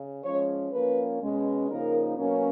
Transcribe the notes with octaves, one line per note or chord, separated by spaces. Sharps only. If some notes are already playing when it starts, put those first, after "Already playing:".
Already playing: C#3
F3 G#3 C#4 C#5
F3 A#3 C#4 B4
B2 G#3 C#4
C#3 F3 A#3 D#4 A#4
B2 F#3 A#3 C#4